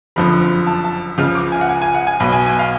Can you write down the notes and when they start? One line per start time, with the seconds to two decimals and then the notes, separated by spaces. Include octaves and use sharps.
0.16 F#1 F2 D3 F3 B5
0.67 A5
0.84 A5
1.18 C#2 C#3 F3 F6
1.35 D6
1.52 G#5
1.61 F#5
1.69 G#5
1.82 G#5
1.94 F#5
2.07 G#5
2.20 B1 B2 B5
2.33 G#5
2.46 G#5
2.59 F5